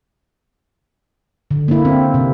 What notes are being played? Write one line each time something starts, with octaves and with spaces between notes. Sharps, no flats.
D3
A#3 E4
C4
C3